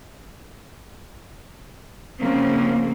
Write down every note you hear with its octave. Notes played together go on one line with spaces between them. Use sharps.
C#3 F3 A#3 C4